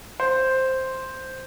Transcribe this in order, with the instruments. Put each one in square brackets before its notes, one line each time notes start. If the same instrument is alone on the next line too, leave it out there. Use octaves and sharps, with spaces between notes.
[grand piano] C5